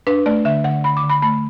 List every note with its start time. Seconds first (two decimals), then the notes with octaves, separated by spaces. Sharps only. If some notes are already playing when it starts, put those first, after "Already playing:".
0.07 D4 B4
0.26 A3 D5
0.45 D3 E5
0.64 D3 F#5
0.84 D3 B5
0.97 D6
1.03 D3
1.09 B5
1.22 A3 B5